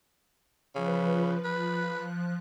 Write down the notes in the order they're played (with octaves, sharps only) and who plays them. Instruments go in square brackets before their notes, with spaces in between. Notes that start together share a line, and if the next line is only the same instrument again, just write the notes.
[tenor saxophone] C#3 [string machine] F3 B4
[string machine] F3 F#6 [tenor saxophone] B4